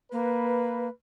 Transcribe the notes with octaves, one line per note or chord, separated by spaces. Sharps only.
A#3 B4